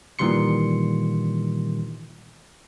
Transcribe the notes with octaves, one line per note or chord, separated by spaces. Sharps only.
A#2 D#3 E3 G3 C6 C#7